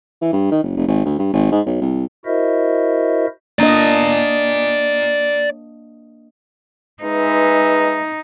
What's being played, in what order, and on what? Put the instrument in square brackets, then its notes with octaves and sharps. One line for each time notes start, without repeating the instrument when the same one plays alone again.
[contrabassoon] E3
G2
D#3
F#1
F1
G#1
D2
G2
G#1
G#2
B1
C2
[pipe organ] E4 F#4 A#4 C5 D#5 E5
[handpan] A#3 D4 D#5 [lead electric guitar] D5 A#5
[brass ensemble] G#3 B4 E5 [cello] D#4